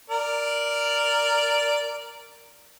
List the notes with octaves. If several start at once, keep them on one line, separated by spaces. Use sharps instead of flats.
A#4 D5